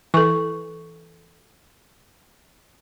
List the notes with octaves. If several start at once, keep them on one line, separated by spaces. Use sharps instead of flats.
E3 A4 C#6